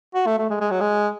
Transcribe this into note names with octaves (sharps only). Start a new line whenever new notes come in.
F#4
A3
A3
G#3
G#3
F#3
G#3